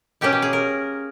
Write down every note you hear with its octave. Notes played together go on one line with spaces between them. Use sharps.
B2 A#3 C#4 G4
G4
G#4
A#4